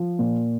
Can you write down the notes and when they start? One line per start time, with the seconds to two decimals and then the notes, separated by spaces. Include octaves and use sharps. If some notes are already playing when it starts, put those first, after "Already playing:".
Already playing: F3
0.19 A#2